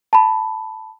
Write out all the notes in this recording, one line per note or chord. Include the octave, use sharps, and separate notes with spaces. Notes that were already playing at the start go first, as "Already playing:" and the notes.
A5 B5